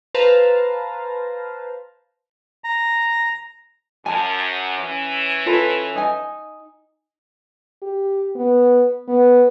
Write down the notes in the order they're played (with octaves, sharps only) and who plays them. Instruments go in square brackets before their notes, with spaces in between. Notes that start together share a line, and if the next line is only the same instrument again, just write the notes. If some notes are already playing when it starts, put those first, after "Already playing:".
[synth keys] B4 C5 F5 A5 A#5
[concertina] A#5
[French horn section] F#2 [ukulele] G#5 A5
[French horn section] E3 C#4
[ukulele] F4 A4 B4
D#4 G#5
[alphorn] G4
B3
B3